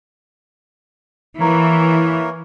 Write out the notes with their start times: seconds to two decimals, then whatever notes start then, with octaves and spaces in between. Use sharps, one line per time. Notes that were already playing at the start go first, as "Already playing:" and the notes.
1.40 E3 A#3 A#4 C#5